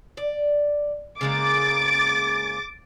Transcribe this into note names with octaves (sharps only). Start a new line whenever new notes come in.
D5
C#3 G#3 A#3 D6 A6